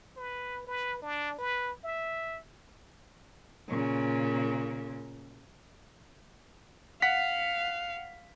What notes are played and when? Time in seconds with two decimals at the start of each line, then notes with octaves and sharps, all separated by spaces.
0.17 B4
0.67 B4
1.02 D4
1.38 B4
1.84 E5
3.68 A#2 C#3
7.02 F5 F#5 B6